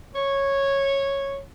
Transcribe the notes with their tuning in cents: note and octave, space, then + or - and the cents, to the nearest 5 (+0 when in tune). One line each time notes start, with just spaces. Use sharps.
C#5 -10